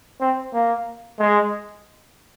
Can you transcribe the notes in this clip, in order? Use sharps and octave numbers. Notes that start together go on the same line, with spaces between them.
C4
A#3
G#3